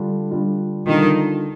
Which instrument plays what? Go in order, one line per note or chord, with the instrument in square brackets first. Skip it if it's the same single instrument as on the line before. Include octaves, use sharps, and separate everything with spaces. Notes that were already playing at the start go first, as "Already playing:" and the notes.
Already playing: [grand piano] D3 G3 D4 F4
D3 G3 D4 F4
[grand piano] D3 G3 D4 F4 [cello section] D#3